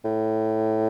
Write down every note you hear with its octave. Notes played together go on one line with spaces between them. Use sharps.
A2